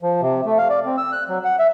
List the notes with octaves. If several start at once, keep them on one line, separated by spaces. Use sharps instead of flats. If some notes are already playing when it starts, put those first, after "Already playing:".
F3
C3
A3
F5
D5
C4
E6
F#6
F#3
F#5
E5